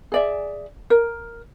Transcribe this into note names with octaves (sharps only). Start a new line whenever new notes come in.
G#4 D5 E5
A#4